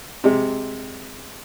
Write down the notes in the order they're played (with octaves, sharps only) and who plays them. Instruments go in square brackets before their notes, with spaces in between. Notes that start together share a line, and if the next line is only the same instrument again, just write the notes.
[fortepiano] C3 G#3